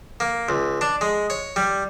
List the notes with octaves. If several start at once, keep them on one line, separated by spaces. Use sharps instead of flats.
A#3
C#2
D4
G#3
C#5
G3